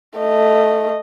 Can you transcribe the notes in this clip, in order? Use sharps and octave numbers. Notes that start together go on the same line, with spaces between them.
A3 D#5